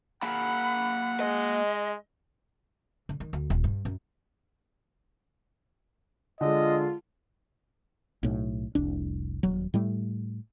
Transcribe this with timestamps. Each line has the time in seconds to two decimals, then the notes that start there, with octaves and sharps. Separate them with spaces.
0.23 A#3 G#4 F#5 B5
1.20 G#3 D#5
3.09 D3
3.20 D#3
3.33 D2
3.50 D#1
3.64 G2
3.85 F#2
6.41 D3 G#3 F4 D#5
8.23 B1 A2
8.75 F1 C2 D4
9.43 D#1 F#3
9.74 A2 G3 A3